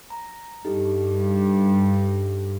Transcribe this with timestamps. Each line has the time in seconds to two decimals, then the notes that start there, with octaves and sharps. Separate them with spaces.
0.10 A#5
0.65 G2 D#4 G4 A4